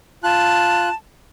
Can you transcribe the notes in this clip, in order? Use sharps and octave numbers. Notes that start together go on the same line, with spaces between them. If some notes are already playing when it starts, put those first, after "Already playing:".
F4 A5 F#6